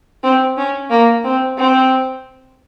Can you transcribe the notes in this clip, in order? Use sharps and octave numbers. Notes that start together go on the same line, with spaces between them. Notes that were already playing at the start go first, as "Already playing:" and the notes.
C4
C#4
A#3
C4
C4